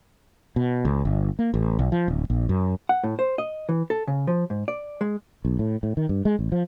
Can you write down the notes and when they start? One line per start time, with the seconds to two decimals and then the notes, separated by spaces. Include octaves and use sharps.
0.56 B2
0.85 C#2
1.05 G1
1.39 A#3
1.54 A1
1.79 B1
1.92 F3
2.08 D1
2.30 A#1
2.49 F#2
2.89 F#5
3.04 A2
3.19 C5
3.38 D#5
3.69 E3
3.90 A4
4.08 C#3
4.27 F3
4.50 G#2
4.68 D5
5.01 G#3
5.45 B1
5.59 A2
5.83 A2
5.97 D#3
6.09 G2
6.25 G#3
6.39 A1
6.52 F3